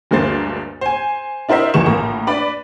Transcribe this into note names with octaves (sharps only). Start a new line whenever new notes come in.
D2 G2 G#3 A#3 C5 A6
C5 G#5
D4 E4 A#4 C5 D#5 E5
G1 C#2 E3 G#4 C#6 E7
A#1 A2 A#3 A#5
D4 B4 D5 B5